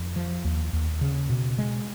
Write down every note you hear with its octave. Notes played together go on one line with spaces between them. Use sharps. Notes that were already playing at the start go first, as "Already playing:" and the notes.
Already playing: F2
F3
D#2
D#2
C#3
B2
G#3